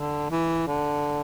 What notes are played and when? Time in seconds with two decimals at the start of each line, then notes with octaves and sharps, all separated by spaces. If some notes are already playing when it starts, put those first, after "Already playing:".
Already playing: D3
0.31 E3
0.67 D3